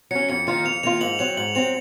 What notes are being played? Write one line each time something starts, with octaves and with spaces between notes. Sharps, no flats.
F#3 C#4 C#7
F2 C#7
D#3 A#3 F4 C#7
F2 F7
D#3 A#3 F4 F7
G#2 F#7
F#3 C4 F7
G#2 F#7
F#3 C4 F7